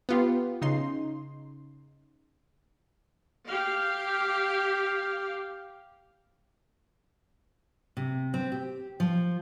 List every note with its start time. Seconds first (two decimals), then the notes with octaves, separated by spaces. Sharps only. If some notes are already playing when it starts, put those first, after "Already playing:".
0.09 B3 F4 G4
0.62 C#3 D#4 C6
3.47 G4 F5
7.97 C3
8.34 C4
8.52 G4
9.00 F3